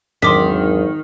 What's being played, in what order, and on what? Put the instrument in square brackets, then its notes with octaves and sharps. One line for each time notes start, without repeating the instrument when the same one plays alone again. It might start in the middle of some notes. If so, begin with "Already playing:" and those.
[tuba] G#1 [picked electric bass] E2 F#3 D4 [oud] D#3 [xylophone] C6 D6 B6